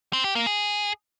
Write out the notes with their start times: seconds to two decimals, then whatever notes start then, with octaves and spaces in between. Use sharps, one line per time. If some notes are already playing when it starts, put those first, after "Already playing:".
0.13 C4
0.24 G4
0.35 A#3
0.46 G#4